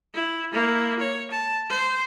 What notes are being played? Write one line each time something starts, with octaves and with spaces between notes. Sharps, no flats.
E4
A#3 E4
C#5
A5
C5